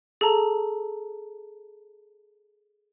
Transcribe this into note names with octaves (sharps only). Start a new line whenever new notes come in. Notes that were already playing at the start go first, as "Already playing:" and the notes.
G#4 A4 A5 A#5